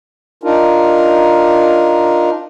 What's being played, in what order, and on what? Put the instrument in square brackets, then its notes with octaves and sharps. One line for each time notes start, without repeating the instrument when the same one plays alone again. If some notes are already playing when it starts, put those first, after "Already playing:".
[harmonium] D4 D#4 F4 A#4